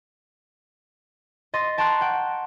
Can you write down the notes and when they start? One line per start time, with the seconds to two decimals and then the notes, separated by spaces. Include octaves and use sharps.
1.54 D#5 C6 A6
1.78 G5 A5 A#5 C6 C#6 F#6
2.01 F#5 G5